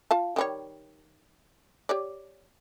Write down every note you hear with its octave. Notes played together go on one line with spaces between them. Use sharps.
F4 F5 A5
D#3 G3 C#5
G4 C#5 D5